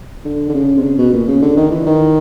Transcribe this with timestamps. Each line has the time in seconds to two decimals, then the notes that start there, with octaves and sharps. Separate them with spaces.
0.25 D3
0.49 D3
0.54 C#3
0.78 C3
0.84 C#3
0.98 B2
1.13 A#2
1.28 C#3
1.42 D3
1.57 D#3
1.71 E3
1.86 D#3